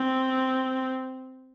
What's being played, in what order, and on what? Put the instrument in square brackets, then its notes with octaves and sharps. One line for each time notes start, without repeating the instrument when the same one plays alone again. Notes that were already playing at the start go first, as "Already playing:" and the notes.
Already playing: [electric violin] C4